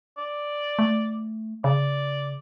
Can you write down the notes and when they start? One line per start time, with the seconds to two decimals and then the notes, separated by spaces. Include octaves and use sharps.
0.17 D5
0.79 A3
1.64 C#3 D5